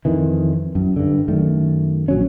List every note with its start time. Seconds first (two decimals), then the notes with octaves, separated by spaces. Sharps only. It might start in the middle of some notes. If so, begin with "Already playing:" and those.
0.05 F2 D#3 E3
0.75 F#2
0.96 G2 D3
1.28 F#2 D#3 A3
2.08 A#1 F#3 C#4